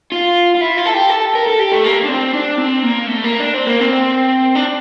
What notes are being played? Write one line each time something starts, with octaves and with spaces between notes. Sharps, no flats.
F4
F4
E4
F4
A4
G4
A4
A#4
A4
G4
A3
A#3
D4
C4
D4
C4
A#3
A3
A#3
D4
C4
A#3
C4
D4